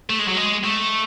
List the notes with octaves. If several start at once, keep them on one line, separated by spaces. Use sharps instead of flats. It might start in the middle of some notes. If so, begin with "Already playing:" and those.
A3
G#3
F#3
G#3
A3